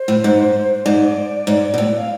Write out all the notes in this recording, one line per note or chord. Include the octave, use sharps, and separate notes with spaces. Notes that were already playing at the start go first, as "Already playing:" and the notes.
Already playing: C5
A2
G#2
C5
G#2 D5
G#2
B2
A2
F5